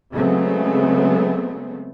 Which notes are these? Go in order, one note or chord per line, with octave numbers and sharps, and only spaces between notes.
C#3 F#3 G#3 A3 B3 C4